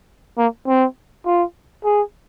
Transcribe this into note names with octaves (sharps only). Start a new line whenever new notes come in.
A#3
C4
F4
G#4